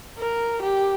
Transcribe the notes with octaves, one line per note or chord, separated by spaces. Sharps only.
A#4
G4